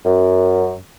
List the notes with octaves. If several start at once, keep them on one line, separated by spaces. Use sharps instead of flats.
F#2